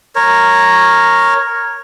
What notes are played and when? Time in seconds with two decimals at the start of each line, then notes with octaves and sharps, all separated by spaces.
0.15 A#4 C#5